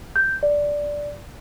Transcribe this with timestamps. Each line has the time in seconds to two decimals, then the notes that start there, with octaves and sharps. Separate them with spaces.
0.16 G6
0.43 D5